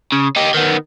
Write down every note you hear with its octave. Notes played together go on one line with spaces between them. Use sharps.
C#3
D#4 G4
D#3 B3